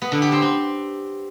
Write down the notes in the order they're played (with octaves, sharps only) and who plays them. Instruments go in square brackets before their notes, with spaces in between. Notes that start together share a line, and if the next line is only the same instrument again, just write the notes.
[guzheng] B3
D3
G4
C4
C4